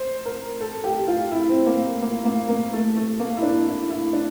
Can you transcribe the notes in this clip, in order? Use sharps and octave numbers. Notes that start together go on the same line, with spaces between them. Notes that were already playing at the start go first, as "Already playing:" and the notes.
Already playing: C5
A#4
A4
G4
F4
E4
C4
A#3
A#3
A#3
A#3
A3
A3
A#3
E4
D4
E4
E4
D4